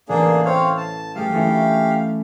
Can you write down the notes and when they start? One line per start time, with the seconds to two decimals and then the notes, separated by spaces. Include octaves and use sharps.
0.09 A1 A#3 D4 G#4
0.45 C4 C#5 F5
0.77 A5
1.15 A3 G4 G#4 F5
1.33 A3 C#4 E4